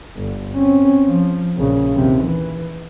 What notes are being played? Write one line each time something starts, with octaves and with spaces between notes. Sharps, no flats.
G1
C4 C#4
F3
A#1 C#3
D#2 C3
E3